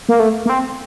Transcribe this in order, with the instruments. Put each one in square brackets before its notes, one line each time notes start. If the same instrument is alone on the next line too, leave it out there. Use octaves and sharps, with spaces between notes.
[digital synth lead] A#3
A3
A#3
C4